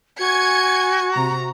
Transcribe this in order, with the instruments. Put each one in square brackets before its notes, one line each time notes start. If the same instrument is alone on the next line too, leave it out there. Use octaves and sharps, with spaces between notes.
[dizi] F#4 [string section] G#5 G#6 C#7
[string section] C3 A#5